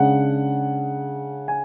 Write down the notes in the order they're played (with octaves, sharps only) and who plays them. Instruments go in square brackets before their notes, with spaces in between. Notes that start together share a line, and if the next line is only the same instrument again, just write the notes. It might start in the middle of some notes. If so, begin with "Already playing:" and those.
Already playing: [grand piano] C#3 G#3 D4 F#5
G#5